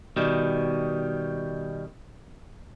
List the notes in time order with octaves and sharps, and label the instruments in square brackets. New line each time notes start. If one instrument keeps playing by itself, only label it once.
[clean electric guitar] B2 D#3 G3